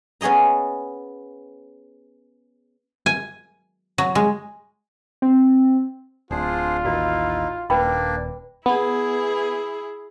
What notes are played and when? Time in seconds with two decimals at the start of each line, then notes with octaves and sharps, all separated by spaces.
0.21 B3 C#4 G#4 D#5 A#5
3.06 G#5
3.98 F#3
4.15 G#3
5.22 C4
6.31 D1 D4 F4 G#4 C5
6.85 A1 D#2 D#4 E4 F#4 D5
7.70 D#1 A#3 D4 B4 D5 G5 B5
8.66 B3 E4 G#4